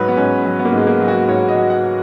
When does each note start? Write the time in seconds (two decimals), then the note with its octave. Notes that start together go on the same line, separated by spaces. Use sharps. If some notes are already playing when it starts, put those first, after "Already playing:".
Already playing: G#2 F#3 B4 C#5
0.08 B3
0.17 G#2 C#4
0.46 F#3
0.59 B3
0.65 A#3
0.72 G#2 G#3
0.87 A#3
1.00 F#3
1.08 F#4
1.28 G#2 C#5
1.48 D#5
1.56 F#3
1.70 F#5